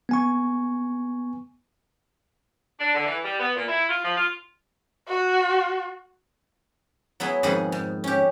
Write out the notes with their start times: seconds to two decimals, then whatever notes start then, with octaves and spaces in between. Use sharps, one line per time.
0.09 B3 G#5 C#6
2.80 D4
2.95 D3
3.06 E3
3.25 G3
3.39 B3
3.56 A#2
3.68 E4
3.89 F4
4.04 F3
4.17 F4
5.08 F#4
7.20 F#3 B3 E4 G#4
7.43 F2 G#2 D#3 G#4 B4 F#5
7.72 G#2
8.04 C#4 G4